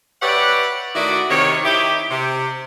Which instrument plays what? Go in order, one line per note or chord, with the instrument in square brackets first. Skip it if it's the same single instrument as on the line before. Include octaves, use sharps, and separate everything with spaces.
[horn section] G4 B4 C#5 D5 E5 F#5
D#3 A3 E4 F#4 D5
C3 D#3 C#5
D#3 D#4 E4 G4
C3